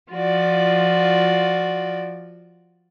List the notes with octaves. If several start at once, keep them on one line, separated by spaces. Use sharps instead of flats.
F3 F4 F#4 D5